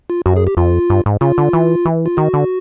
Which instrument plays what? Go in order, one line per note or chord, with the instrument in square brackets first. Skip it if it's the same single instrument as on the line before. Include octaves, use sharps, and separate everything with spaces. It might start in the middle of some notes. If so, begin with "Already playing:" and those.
[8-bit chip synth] F4
[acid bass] F#2 [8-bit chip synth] F#4
[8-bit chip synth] G#4
G4
[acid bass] F2 [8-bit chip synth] F4
[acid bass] G2
G#2
[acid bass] C#3 [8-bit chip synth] F4
[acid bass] D3
E3
E3
[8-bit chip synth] F4
[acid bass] D#3 [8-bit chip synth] F#4
[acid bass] D3